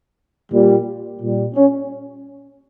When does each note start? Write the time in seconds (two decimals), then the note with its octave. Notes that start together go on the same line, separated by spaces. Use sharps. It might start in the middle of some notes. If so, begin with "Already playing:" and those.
0.52 A#2 G3
1.20 A#2 G3
1.55 C#4